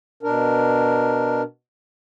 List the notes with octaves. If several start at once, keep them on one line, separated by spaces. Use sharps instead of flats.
B2 D4 A#4